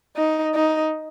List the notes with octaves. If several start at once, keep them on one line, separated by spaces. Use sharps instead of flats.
D#4
D#4